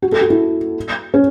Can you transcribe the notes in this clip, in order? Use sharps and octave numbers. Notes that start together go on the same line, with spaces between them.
F#4
A4
F#4
E4
C#4